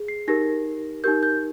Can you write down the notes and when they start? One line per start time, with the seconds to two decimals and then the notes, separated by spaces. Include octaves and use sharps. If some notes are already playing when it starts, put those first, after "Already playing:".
Already playing: G#4
0.08 C7
0.28 D#4 G4 A#4 A#6
1.04 D#4 G4 A#4 G6
1.23 G6